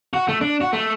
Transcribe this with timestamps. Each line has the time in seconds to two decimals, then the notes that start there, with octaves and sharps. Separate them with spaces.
0.13 F#4
0.28 A3
0.41 D4
0.61 F#4
0.73 A3